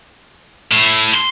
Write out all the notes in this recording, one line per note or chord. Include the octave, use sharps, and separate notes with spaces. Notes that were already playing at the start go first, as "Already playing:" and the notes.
A2
C6